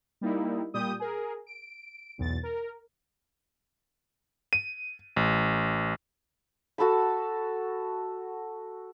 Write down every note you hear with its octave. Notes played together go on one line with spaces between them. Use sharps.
G3 A#3 D#4 E4
A#2 G3 G4 D#6 G6
G#4 A#4
D7
B1 E2 A6
A#4
D#7
A1
F#4 A4 A5 B5